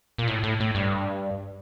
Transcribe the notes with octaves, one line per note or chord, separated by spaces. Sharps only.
A#2
A2
A2
A2
G2